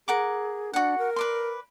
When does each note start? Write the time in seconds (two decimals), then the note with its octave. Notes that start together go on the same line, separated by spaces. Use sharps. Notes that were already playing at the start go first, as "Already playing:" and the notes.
0.08 G#4 A#4 F#5 D6
0.73 D4 F#4 F#5
0.98 A#4
1.16 B4 D5 C6